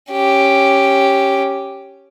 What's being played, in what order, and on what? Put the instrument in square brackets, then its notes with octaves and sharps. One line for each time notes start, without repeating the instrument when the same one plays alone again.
[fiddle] C#4 G4